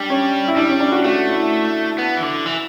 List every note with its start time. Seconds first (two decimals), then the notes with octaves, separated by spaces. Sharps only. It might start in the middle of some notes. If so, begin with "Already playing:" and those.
Already playing: G3 D4
0.10 C#4
0.48 E4
0.56 G3 D4
0.69 C#4
0.80 D4
0.92 F#4
1.04 A3 F#4
1.29 E4
1.98 B3
2.17 E3
2.22 D3
2.46 E3